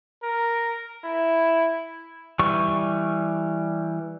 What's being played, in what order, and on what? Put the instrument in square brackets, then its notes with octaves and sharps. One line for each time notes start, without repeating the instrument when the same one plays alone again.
[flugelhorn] A#4
E4
[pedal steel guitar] E3 G3 C#6